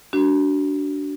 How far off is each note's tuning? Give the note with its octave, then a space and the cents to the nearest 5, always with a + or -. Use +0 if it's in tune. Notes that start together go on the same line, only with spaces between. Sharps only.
D4 -15 F#4 +25